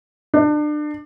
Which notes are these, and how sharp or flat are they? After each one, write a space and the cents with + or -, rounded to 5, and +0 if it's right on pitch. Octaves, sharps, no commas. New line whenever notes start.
D4 +30